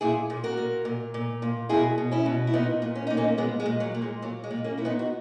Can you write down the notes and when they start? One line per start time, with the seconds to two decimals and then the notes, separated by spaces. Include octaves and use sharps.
0.01 A#2 E4 G#4
0.30 A#2
0.44 F#4 A#4
0.57 A#2
0.85 A#2
1.14 A#2
1.42 A#2
1.69 B2 E4 G#4
1.98 B2
2.11 C#4 E4
2.26 B2
2.47 E4
2.53 A#2 B3 D#4
2.82 A#2
2.95 C#4
3.07 A#2 D#4
3.17 A#3 C#4
3.38 A#2 G#3 B3
3.60 G#3
3.66 A#2
3.80 F#3
3.94 A#2
4.02 G#3
4.22 A#2 F#3
4.44 G#3
4.51 A#2
4.64 A#3 C#4
4.78 A#2 E4
4.85 B3 D#4
4.99 F#4